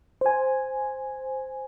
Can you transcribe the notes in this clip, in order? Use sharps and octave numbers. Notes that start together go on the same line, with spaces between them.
C5 G#5